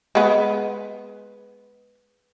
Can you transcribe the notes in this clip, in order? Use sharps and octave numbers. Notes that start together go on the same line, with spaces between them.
G#3 B3